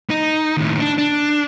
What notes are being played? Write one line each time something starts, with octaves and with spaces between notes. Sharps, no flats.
D#4
D#2 A2
D4
D4